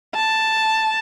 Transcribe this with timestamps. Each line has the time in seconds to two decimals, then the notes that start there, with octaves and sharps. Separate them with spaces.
0.14 A5